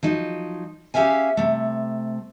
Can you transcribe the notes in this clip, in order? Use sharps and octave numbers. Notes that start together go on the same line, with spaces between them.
F3 F#3 D#4
C#4 G4 E5 F5 G#5
C3 A3